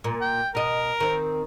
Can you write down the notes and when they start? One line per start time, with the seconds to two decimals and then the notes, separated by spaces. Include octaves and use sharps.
0.04 A#2
0.21 G5
0.55 B2 A#4 D#5
1.00 D#3 C4